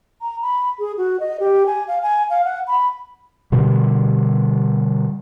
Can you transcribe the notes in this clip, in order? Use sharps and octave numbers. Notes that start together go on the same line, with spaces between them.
A#5
B5
G#4
F#4
D#5
G4
G#5
F5
G#5
F5
F#5
B5
B2 D3 G3